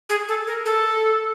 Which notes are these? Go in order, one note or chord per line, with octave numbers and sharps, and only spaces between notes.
G#4
A4
A#4
A4